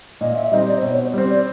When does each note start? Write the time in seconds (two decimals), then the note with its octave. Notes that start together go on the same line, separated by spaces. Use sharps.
0.21 A#2 D#5
0.32 D#5
0.36 E5
0.51 G3 C4 D#4 D#5
0.67 D5
0.77 C5
0.83 B2 C#5
0.98 C5
1.13 G3 C4 C5
1.29 D5